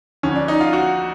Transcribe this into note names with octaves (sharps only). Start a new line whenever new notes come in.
F2 D3 C#4
D4
D#4
F4
F#4